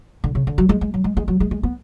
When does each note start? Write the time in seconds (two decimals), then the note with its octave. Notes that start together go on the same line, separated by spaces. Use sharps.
0.24 D3
0.35 C#3
0.47 D3
0.58 F#3
0.69 G#3
0.81 G#3
0.94 F#3
1.04 G#3
1.17 G#3
1.28 F#3
1.40 G#3
1.51 G#3
1.63 B3